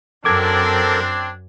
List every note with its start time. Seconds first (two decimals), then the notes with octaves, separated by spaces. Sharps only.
0.25 F#2 C4 D4 A4 A#4 D6 G#6